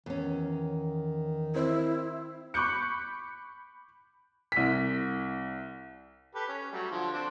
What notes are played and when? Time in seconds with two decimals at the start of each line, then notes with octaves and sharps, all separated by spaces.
0.06 E2 D#3 C#4
1.55 C4 E4 C5
2.54 B5 C#6 D6 F#6 G6 C#7
4.52 C2 B6
6.35 G4 A4 B4
6.48 C#4
6.72 F#3 G3 A3
6.91 D3 F3
7.13 C4 D4